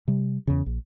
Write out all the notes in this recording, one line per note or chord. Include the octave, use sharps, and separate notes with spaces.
C3 G3
E2 C#3
A#1